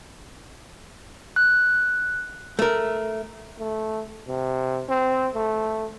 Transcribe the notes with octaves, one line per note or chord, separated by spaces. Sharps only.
F#6
A3 A#4
A3
C3
C4
A3